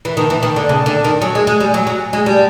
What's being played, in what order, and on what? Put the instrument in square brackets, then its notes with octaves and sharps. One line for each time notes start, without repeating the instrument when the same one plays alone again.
[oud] E3
[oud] D#3 [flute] A5
[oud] E3
D#3
D3
C#3
D3
D#3
[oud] F#3 [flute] G#5
[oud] G#3
G#3
G3
F#3
F#3
[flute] G#5
[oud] G#3
[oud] G3 [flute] A5